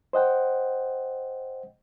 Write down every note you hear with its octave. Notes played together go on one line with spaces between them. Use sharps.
C5 D#5 F#5 G5